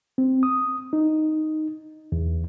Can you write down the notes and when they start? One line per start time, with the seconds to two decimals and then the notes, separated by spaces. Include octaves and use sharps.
0.18 C4
0.43 D#6
0.93 D#4
2.12 E2